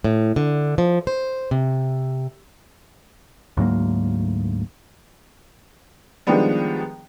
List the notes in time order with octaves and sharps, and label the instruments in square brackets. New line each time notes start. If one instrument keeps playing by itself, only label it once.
[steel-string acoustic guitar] A2
D3
F3
C5
C3
[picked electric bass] D2 G#2 F#3 A#3
[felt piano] D#3 F3 G3 G#3 B3 D4